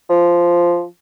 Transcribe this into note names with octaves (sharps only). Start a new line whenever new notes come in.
F3